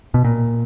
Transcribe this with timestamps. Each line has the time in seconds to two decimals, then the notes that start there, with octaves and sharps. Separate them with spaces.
0.14 B2
0.24 A#2